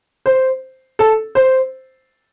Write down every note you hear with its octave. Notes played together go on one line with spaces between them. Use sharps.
C5
A4
C5